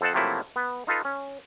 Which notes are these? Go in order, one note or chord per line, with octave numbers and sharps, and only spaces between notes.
F2 A4 C5 D#5 F#5 A5
C3 F3 F#3 A3 A#3 E4
B3
D#4 F4 A4 B4
C#4